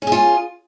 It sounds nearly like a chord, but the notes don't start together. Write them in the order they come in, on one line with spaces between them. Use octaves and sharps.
C#4 G#4 F4